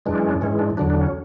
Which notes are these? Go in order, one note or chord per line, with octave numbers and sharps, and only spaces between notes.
F#2 E3 G#3 D4
C#4
D4
G#2 E3 G#3 C#4
D4
E2 D3 F#3 D4
D4
C#4